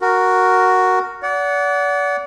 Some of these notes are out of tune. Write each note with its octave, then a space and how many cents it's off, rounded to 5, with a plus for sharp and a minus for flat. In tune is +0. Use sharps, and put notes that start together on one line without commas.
F#4 +0 A#4 +0
D5 -35 F#5 +0